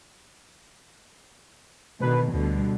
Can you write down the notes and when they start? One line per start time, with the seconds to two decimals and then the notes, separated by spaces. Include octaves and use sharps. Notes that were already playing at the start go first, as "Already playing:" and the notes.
2.01 B2 D3 D#3 B4
2.33 D2 B2 D3 G3